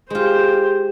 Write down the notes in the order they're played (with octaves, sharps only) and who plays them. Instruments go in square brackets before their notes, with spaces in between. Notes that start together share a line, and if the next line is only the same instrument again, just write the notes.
[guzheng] G#3 F4 [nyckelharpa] G4 C5